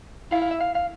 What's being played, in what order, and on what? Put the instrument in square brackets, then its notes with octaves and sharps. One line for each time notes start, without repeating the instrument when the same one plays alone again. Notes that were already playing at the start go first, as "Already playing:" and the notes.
[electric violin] E4 [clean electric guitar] F5
[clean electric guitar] F5
E5
F5
F5